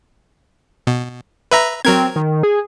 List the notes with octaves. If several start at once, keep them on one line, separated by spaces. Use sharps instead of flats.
B2
B4 E5 A#5
F#3 C4 A#4 G#6
D#3
G#4